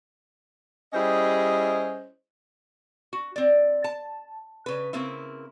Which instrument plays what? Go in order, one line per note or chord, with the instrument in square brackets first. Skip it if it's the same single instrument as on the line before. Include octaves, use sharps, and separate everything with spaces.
[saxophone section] G3 C#4 E4 G#4 C5 D#5
[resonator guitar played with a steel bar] F#4
C4 D5
A5
C#3 B4
C#3 A#3 C4 E4